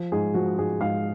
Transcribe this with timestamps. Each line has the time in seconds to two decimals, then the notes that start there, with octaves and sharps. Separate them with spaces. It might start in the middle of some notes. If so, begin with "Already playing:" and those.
Already playing: F3
0.12 G#2 G#4
0.34 F3 F#4
0.59 G#2 G#4
0.81 G#2 F5